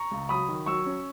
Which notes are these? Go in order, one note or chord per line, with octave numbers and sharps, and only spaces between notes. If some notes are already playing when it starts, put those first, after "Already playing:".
Already playing: A#5 C#6
C#2
F#3 B5 D#6
D#3
F#3 C#6 E6
C#4